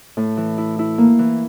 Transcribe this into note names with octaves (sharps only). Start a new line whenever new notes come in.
A2
E3
E4
E4
A#3
E3